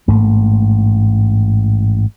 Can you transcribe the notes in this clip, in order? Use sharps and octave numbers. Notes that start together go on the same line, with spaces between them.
A1 G#2 A3 A#3